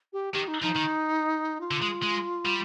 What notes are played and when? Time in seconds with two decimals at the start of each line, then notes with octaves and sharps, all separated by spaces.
0.13 G4
0.33 D#3 G4
0.48 D#4
0.62 F3 D#4
0.75 D#3
1.61 F4
1.71 D3
1.82 G#3
2.03 G#3
2.45 G3